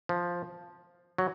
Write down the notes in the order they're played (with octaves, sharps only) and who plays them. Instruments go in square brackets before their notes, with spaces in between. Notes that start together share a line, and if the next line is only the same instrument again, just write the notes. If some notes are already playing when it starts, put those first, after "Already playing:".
[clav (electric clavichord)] F3
F#3